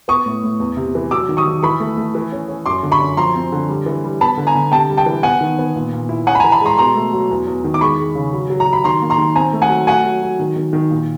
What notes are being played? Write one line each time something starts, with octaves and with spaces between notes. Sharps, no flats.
B3 C#6 D#6
A2
A2
E2
C3
E3
F#3 D6 E6
D#3
C#6 D#6
D#3
E3 B5 C#6
A3
A3
E3
C#4
C#4
F#2 C6 D6
D3
B5 C#6
F#2
F3 A#5 C6
C4
D3
G3
E3
G3
B3 A5 B5
D3
G#5 A#5
D3
C3 G5 A5
G3
G5 A5
E3
B3 F#5 G#5
D#3
B3
A#2
A#2
E4
C#4 F#5 G#5
B5
G#5 A#5
E3
A5 B5
G#3 A#5 C6
B2 A#5 C6
A3
F#3
E2
E2
D#3
D6
G#3 B5 C#6
G#3
C#3
F#3
F#3
A#5
F#3
B5
D#3 A#5 C6
A#3
A#5 C6
D#3
C4 G#5 A#5
A3
F#5 G#5
F#3
A3 F#5 G#5
F#3
F#3
D#3
D#3
D#3
A#2